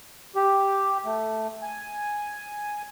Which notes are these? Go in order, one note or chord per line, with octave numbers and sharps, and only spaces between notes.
G4
A3
G#5